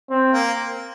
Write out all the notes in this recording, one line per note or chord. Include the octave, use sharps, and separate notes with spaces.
C4
A#3